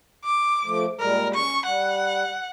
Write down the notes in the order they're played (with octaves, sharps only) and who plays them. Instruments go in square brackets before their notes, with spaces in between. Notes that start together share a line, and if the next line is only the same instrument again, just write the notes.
[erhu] D6
[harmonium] F3 A3
[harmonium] A#2 G3 G#3 [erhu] A#4
[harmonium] C#4 [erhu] C#6
[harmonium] G3 [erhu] F#5